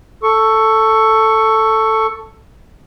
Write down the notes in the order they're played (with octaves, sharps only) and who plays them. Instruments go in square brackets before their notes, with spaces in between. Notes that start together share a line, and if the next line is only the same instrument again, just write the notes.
[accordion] A4 C#6